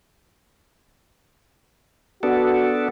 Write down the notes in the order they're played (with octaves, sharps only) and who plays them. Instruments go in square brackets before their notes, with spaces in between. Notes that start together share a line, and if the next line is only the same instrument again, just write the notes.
[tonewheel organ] B3 D4 A4 [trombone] F#4